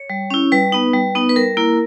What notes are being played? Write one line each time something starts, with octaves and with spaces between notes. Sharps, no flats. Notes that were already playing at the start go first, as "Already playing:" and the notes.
Already playing: C#5
G3
C#4 E4
G3 B4
B3 D#4
G3
B3 D#4
B4
G3 A#4
A#3 E4